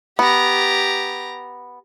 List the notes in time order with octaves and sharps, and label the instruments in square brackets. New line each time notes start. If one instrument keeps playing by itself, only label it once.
[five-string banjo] B3 [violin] G4 A#5